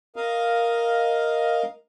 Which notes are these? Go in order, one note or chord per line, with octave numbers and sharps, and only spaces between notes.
A#4 D#5 F5